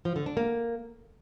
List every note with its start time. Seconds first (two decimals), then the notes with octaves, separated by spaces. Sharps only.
0.05 F3
0.16 D3
0.26 D4
0.37 A#3